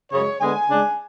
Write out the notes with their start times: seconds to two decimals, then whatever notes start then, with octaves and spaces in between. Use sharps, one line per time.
0.11 F#2 C#3 G#3 C#5
0.39 D3 G#3 B3 G#5
0.69 C#3 G#3 D4